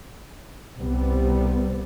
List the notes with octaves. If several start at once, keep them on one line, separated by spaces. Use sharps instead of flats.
C2 C3 G3 B3